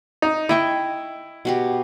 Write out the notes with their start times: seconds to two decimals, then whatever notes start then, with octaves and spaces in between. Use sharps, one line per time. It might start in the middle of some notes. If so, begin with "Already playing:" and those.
0.22 D#4
0.49 E4 D#5 G5 C#6
1.45 B2 F#4 G4